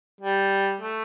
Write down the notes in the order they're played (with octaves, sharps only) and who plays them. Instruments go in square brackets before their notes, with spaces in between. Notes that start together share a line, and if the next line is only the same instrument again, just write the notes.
[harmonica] G3
A3